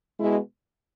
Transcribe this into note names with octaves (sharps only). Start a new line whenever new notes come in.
B2 G#3 E4